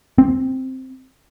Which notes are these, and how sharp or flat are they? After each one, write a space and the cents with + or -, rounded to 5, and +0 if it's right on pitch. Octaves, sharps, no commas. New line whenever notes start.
C4 +0